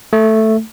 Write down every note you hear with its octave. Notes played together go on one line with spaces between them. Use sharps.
A3